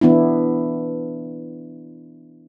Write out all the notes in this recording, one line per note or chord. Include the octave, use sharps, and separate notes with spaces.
E3 B3 D4 E4